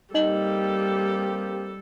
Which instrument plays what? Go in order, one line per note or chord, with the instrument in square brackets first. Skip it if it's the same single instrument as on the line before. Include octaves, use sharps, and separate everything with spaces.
[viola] G3 A4 [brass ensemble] A#3 C4 G4 [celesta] D#4 D#5 F#7